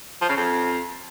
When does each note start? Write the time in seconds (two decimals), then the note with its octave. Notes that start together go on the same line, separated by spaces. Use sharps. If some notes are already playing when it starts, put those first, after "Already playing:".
0.22 F3
0.29 C#3
0.37 F2